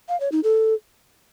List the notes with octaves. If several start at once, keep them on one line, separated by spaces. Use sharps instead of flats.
F5
C#5
D#4
A4